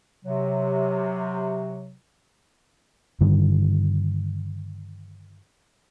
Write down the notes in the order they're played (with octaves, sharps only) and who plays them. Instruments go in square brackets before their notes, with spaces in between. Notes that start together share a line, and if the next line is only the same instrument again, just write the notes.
[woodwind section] C3 F#3
[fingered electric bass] G2 D3 D#3